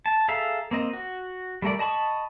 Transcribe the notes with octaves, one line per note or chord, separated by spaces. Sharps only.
A5
G#4 A4 E5 F5 A#5
A#3 C4 D#5
F#4
G3 A3 A#4 D5
D#5 A5 B5 C#6 D#6